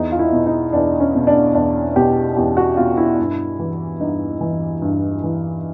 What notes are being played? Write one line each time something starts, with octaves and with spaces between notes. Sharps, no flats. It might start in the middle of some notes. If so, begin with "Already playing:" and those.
Already playing: E2 D#4
F4
E4
B2
D#4
E2 D4
C#4
B2
D4
E2 D4
B2 G4
E2 G4
F#4
B2 F4
E4
G2
E3
G2 D#4
E3
G2
E3